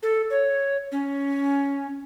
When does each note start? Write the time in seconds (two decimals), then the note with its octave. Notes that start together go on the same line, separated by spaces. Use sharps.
0.03 A4
0.30 C#5
0.92 C#4